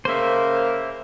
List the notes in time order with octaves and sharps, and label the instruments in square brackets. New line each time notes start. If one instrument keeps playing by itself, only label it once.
[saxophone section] C#3 A#3 [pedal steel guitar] C5 E5